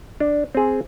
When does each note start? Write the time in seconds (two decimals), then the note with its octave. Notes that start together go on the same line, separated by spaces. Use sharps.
0.20 D4
0.55 C4 G#4